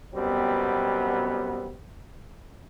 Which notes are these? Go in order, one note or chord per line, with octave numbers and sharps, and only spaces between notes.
F#2 B2 G3 B3 C4